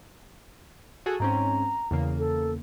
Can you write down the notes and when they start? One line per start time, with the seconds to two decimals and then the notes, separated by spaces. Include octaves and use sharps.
1.06 F#4 G#4 A4
1.20 G#2 C4 C#4 A#5
1.91 E2 C#3 A#3
2.18 A4